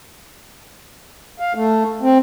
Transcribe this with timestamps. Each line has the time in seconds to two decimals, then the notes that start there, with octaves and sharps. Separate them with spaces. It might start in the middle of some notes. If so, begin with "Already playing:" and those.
1.40 F5
1.55 A3
2.02 C4